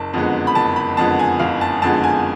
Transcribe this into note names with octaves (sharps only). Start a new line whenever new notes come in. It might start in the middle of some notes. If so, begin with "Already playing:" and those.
Already playing: F#1 A5
F2 D3 G#3 B3
B5
F#1 A5
B5
F2 D3 G#3 B3 A5
G#5
F#1 F5
A5
F2 D3 G#3 B3 A5
G#5